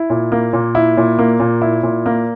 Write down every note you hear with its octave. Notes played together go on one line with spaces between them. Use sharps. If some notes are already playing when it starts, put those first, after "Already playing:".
Already playing: E4
A#2
A#3
A#2
E4
A#2
A#3
A#2
E4
A#2
A#3